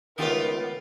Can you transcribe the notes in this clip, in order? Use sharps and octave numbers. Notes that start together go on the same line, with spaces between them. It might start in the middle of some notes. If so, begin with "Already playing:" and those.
C#2 D#3 A3 B3 F4 G4 A#4 D#6